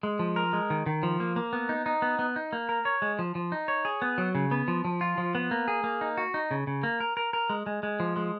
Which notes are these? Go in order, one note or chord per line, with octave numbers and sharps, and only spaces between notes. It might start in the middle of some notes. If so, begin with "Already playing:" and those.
G#3
F3
A#4
G#3
D#3
D#3
F3
A#3
A#3
B3
D#4
D#4
B3
B3
D#4
A#3
A#4
C#5
G#3
F3
F3
D#4
C#5
G#4
B3
F#3
C#3
B3
F3
F3
F4
F3
B3
A#3
G#4
A#3
D#4
F#4
D#4
C#3
C#3
A#3
A#4
A#4
A#4
G#3
G#3
G#3
F3
G#3